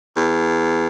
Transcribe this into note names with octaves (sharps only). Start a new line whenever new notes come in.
E2